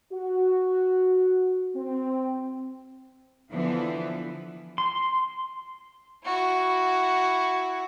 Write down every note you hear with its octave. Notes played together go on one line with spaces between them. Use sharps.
F#4
C4
D3 E3 F3 B3
C6
E4 F#4